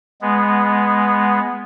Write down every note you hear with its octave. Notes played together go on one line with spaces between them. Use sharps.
G#3 B3